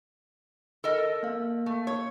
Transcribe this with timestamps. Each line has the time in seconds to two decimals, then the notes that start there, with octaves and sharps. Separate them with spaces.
0.84 A4 A#4 D#5
1.23 A#3 F5
1.66 A3
1.87 C#5